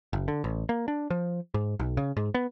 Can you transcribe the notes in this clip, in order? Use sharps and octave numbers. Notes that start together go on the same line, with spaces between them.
F#1
D3
A1
A#3
D4
F3
G#2
B1
C#3
G#2
B3